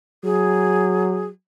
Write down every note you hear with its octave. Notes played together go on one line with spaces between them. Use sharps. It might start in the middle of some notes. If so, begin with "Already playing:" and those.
F#3 G#4